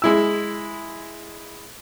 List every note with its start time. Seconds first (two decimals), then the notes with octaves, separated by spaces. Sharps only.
0.02 G#3 E4 E6